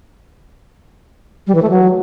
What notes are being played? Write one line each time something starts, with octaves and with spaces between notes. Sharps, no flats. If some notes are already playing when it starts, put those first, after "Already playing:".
G3
E3
A3
F#3